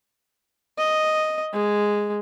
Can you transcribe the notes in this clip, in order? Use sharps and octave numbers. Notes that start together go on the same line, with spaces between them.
D#5
G#3